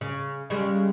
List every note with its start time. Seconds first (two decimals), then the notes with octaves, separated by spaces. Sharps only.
0.01 C#3
0.50 C#3 G3 G#3